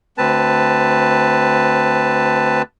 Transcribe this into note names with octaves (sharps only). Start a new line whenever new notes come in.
D2 C4 B4 A5